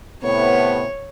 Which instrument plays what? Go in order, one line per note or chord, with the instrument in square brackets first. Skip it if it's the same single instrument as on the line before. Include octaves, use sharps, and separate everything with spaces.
[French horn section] A2 C3 B3 [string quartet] C#5